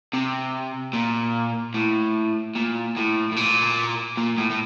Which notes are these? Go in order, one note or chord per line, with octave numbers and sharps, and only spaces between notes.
C3
A#2
A2
A#2
A2
A2
A#2
A#2
A2
A2